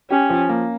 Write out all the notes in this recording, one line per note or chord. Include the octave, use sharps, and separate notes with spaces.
C#4 G4
F3
A#3